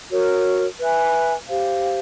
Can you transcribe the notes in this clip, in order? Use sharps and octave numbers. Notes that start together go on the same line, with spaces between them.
F#4 A#4 C#5
B4 E5 G#5
G4 C5 F5